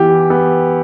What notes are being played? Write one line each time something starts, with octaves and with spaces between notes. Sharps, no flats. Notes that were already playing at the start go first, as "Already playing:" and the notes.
Already playing: E3 B3 G4
B3